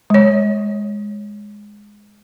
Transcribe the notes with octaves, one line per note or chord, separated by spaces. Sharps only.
G#3 C#5